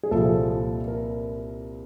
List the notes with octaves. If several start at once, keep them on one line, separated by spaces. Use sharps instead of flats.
G#4
C2 A#2 F3 A4
A#4